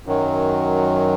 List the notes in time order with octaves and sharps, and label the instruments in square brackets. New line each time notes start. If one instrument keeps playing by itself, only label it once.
[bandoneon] F#2 D#3 F#3